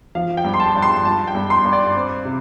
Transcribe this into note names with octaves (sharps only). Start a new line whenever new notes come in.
F3 F5
G5
G2
C6
A5
G2
C6
G2 A5
G5
G2
C6
G2
D5
C4
C3